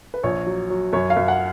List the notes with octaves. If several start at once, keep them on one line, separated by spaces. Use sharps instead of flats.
B4
A#1 C#5
F#3
F#3
F#2 C#5
F5
F#2
F#5